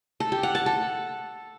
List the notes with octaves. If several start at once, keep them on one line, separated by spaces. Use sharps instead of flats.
A4
G4
F#5
A5
A4